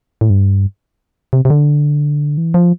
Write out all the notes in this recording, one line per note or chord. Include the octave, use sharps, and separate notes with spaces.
A2
G2
C3
C3
D3
E3
F3